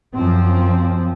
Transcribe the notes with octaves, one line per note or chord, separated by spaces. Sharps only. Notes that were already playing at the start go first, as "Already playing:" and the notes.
F#2 F3 C4